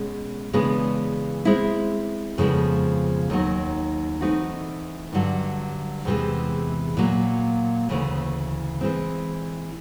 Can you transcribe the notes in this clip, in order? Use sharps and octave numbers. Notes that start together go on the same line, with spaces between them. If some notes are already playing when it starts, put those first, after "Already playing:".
Already playing: B2 G#3 C#4
C#3 E3 G#3 B3 D4
G#3 C4 E4
F2 C#3 F3 G#3 B3
D#2 D#3 F#3
E3 A3 C4 D#4 F#4
G2 D3 F#3
E2 C3 E3 G#3
A#2 F#3 A#3
D2 C#3 E3
E3 G#3 C4